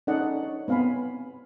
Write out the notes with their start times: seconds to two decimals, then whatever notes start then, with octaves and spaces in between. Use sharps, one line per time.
0.07 C#4 D#4 A4 D5 D#5 F#5
0.43 C#5
0.68 B3 C4 F5 G#5 B5